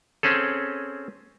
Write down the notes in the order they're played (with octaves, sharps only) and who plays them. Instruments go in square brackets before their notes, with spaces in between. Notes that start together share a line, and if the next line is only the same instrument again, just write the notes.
[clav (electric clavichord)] C4 C#4 G#4 A4